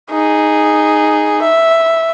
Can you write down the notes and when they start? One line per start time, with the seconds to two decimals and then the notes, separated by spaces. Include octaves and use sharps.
0.11 D#4 G#4
1.42 E5